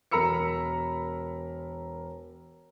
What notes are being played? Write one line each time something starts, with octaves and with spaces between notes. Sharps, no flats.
E1 A#4 A#5 B5 E6 C#7